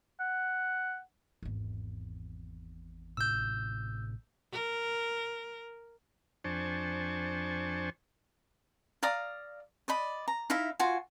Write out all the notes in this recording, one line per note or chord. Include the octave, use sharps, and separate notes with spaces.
F#5
G#1 E2
A1 A2 C3 E6 G6
A#4
F2 D4 C5 G#5 A5 C#6
D5 F5 A#5 D#6
D5 D#5 B5
A#5
D#4 E4 E5 F5
F4 F#4 G#5